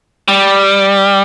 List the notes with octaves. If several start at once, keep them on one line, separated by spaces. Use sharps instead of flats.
G3